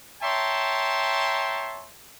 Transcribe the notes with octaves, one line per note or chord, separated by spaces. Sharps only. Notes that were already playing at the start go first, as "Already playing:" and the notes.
C#5 E5 G5 A5 A#5 C6